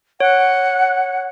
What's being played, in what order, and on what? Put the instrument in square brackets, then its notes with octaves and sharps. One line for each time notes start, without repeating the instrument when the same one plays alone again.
[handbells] C#5 [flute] F#5